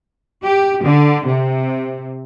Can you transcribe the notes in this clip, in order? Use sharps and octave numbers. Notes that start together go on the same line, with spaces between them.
G4
D3
C3